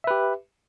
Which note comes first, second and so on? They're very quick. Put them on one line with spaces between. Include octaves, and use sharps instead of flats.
E5 B4 G4